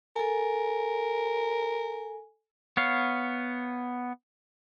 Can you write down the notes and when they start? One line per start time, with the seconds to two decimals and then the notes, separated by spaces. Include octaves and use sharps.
0.16 A4 A#4 G#5
2.77 B3 C#5 F5